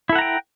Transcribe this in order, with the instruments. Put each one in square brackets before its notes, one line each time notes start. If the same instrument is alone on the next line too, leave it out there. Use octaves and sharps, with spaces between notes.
[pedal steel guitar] E4
A4
F#5
A#5
G5